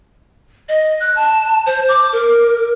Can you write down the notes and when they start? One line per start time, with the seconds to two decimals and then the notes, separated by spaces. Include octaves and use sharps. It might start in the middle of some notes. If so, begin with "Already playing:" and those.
0.69 D#5
1.00 F#6
1.16 A5
1.66 C5
1.89 D6
2.12 A#4